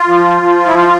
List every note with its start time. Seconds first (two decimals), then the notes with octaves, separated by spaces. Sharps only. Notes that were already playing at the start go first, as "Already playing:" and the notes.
Already playing: F4
0.08 F3
0.42 F3
0.66 E4
0.75 F4